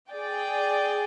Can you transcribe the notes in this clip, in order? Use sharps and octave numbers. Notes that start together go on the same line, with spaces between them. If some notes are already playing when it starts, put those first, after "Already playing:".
G#4 D5 G5